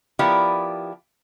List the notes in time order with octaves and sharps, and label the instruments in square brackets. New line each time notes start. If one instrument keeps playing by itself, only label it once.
[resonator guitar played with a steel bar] F3 B3 E4 G4 A#4 D5